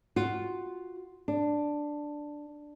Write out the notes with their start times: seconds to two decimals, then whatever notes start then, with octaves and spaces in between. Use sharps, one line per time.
0.16 F4 F#4
1.28 D4